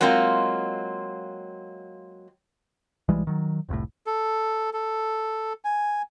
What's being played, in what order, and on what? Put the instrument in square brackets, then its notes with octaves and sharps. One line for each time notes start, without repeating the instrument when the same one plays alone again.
[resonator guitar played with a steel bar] F#3 G#3 A#3 C4 F4
[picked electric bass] B1 E3 G3 G#3
D#3 F#3
F1 C2 A2
[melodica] A4
A4
G#5